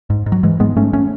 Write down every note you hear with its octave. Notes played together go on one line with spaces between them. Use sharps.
G#2
G#2
F#3
G#2 E3 G#3
G#2 G#3 B3
G#2 A3 C#4
A3 C#4